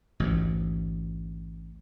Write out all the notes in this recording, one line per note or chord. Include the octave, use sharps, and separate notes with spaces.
A1 D2 G#2